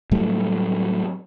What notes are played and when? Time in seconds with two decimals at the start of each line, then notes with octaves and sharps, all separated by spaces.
0.11 A2 F#3 G3 A3